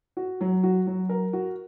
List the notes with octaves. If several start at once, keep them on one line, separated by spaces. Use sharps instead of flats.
F#4
F#3
F#4
F#3
A#4
F#4